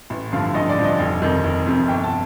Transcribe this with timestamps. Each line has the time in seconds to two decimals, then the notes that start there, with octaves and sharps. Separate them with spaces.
0.10 A1
0.32 G2 D3 F3 F5
0.54 A1 D#5
0.69 D5
0.78 G2 D3 F3
0.84 D#5
1.00 F1
1.22 F2 C3 D#3
1.44 F1
1.66 F2 C3 D#3
1.88 G1 G5
2.04 A5